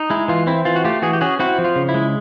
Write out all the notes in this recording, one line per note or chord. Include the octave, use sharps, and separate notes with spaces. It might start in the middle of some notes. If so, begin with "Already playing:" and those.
Already playing: D#4
G#3 E4
E3 F4
C4 E4
E3 F4
F#4
A3 F4 G4
E3 F#4 G#4
G4
C#4 F#4 G#4
C4 E4 F#4
F3
F4
C#3
E4
G#3